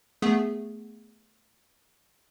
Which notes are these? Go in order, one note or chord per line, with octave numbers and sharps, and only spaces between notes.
A3 B3 G#4